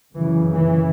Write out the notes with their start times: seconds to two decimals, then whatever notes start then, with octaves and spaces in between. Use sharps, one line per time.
0.15 F#2 C#3 E3
0.52 E3